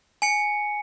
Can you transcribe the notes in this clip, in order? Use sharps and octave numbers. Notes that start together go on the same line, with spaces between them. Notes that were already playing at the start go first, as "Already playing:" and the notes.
G#5 C#7